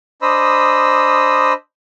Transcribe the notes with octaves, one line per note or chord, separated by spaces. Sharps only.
D4 C5 D#5 B5 D#6 E6